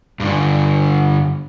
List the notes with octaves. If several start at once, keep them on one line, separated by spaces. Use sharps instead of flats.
G2 D3